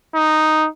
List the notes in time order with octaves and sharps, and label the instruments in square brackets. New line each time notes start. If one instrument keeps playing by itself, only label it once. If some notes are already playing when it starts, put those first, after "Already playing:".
[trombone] D#4